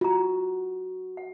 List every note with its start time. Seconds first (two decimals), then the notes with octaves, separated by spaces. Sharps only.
0.01 F4 F#4 A#5
1.17 F#5